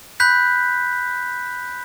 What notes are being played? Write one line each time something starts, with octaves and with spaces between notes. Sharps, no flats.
B5 F#6 G6 B6